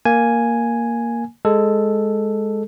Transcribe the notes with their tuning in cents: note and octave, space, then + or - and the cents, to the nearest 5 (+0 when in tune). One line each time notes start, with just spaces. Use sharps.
A#3 +0 G#5 +0
G#3 +0 A4 +0